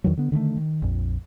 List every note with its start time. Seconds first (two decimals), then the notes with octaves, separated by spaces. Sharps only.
0.04 E2 D#3 E3 F#3
0.17 D3 B3
0.32 D3 D#3 G#3 A3
0.57 D#3
0.82 A#1 F2